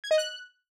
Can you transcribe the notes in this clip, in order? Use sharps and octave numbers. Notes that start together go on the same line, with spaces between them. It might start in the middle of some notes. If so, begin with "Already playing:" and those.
G#6
D#5
F#6